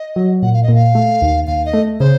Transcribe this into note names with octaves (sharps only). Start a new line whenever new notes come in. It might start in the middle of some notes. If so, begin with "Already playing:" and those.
Already playing: D#5
F#3
A#2 F#5
F5
D#5
A#2
F5
A3
D#2
D#2 F5
D#5
A3
C#3 C5